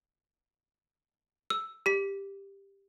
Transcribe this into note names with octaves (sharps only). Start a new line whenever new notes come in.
E6
G4 B6